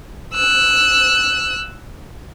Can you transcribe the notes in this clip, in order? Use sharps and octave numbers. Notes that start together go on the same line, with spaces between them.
E6 F#6